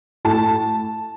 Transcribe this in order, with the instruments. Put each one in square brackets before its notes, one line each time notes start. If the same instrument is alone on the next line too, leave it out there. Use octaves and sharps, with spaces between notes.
[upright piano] A2 A5